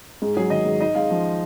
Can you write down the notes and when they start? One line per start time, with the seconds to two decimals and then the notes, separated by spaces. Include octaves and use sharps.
0.22 G#2 G#4
0.37 F#3 G#4
0.50 D#3 D#5
0.66 G#2
0.81 D#4 D#5
0.95 G#3 F5
1.11 F3